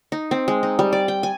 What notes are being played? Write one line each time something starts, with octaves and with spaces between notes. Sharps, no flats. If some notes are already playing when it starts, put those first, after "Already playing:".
D#4
C4
G#3
D#4
G3
D5
G5
G#5